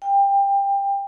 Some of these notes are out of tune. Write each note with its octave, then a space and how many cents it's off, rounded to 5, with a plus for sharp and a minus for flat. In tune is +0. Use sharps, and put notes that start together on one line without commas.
G5 +20